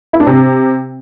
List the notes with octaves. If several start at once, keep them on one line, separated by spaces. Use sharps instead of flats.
E4
D4
C3